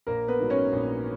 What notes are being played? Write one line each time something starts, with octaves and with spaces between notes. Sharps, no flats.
A#1 A#3 A#4
B3 B4
G#2 F#3
C#4 C#5
A#1